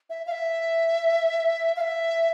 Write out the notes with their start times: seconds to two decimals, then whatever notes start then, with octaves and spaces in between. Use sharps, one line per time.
0.10 E5
0.27 F5
0.31 E5
1.76 F5
1.81 E5